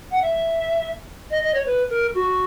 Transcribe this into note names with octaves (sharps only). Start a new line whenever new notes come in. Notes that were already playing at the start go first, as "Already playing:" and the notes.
F#5
E5
D#5
D#5
C#5
B4
A#4
F#4